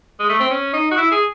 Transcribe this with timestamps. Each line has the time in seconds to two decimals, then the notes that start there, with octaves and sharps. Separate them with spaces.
0.20 G#3
0.29 A3
0.40 C4
0.50 C#4
0.73 D#4
0.91 F#4
0.97 E4
1.11 G#4